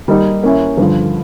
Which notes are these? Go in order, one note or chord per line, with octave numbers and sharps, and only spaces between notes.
G3 A#3 D#4 G4
A#3 C#4 E4
G2 D3 F3